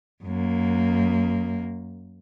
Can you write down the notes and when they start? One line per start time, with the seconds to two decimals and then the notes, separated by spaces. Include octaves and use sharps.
0.24 F#2 A#3